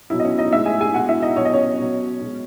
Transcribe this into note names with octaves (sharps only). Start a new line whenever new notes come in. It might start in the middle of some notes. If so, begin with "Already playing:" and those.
B2 F#3 E4
D#5
C#4 C#5
D#4 D#5
A2 G#3 E4 E5
G#4 G#5
G#4 G#5
B2 G#3 F#4 F#5
E4 E5
D#4 D#5
B2 F#3 C#5
D#5
C#4 C#5
B2 F#3
B2 G#3